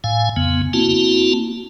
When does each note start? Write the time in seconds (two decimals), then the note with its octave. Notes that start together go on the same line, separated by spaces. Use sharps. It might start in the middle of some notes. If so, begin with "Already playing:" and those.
0.04 A2 F5 G#5
0.36 F2 C#3 B3
0.73 A#3 C4 E4 F#4 A5